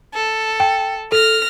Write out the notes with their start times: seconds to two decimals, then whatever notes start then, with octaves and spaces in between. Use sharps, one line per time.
0.14 A4
0.60 G5
1.12 A4 F6 A#6